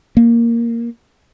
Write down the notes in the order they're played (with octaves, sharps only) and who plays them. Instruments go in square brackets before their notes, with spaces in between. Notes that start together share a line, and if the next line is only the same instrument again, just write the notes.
[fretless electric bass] A#3